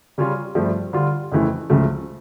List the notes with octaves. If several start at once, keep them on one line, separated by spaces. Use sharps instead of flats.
C#3 G3 C#4 F4
G2 F3 A3
D3 G3 D4 F4
F2 C#3 E3 A3 E4
C#2 C#3 F3 A3